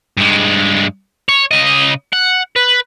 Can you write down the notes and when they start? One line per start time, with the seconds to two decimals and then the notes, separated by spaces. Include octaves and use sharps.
0.17 G2 G#3
1.29 C#5
1.51 C#3 D#5
2.13 F#5
2.56 B4